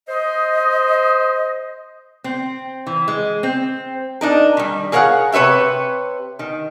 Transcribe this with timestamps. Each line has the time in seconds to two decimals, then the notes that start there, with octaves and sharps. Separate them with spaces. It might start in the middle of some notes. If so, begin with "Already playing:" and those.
0.09 C5 D#5
2.24 C4
2.87 E3
3.08 G#3
3.43 C4
4.21 D4 D#4 A#4
4.57 D#3 G3
4.92 G#4 A#4 C#5 F5 F#5
5.32 C3 B4 C#5 E5 G5
6.39 D#3